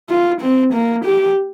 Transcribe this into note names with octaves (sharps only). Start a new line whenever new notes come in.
F4
C4
A#3
G4